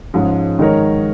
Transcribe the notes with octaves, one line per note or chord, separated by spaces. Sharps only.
G#2 F3 G#3 C#4
D#3 G#3 D#4 A#4 C#5